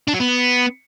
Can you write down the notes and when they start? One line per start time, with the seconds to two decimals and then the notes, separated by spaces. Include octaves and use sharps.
0.08 D4
0.14 F#3
0.20 B3